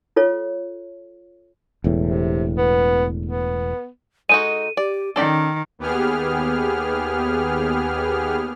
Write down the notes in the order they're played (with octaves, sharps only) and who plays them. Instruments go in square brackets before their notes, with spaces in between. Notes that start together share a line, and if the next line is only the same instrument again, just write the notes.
[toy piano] F4 A4 C#5
[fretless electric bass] E1 E2 A2
[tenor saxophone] C3
B3
B3
[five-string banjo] G#3 D#4 F#4 [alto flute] A4 [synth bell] D#7
[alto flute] G4 [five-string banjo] D5
[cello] D#3 [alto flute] C#4 [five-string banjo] A4 D5 G5
[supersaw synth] D#2 B3 G4 G#4 F6